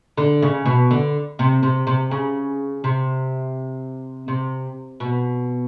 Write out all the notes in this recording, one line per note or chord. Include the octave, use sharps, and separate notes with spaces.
D3
C#3
B2
D3
C3
C3
C3
C#3
C3
C3
B2